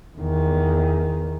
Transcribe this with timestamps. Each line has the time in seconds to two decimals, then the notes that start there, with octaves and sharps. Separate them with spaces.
0.18 E2 D#3